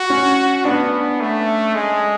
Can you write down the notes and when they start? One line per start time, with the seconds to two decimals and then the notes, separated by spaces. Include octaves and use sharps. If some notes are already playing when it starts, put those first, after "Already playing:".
Already playing: F#4
0.10 C#4
0.65 B3 D4
1.21 A3
1.75 G#3